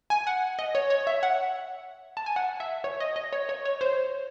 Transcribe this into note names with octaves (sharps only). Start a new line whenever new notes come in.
G#5
F#5
D#5
C#5
C#5
E5
F#5
A5
G#5
F#5
E5
C#5
D#5
D#5
C#5
C#5
C#5
C5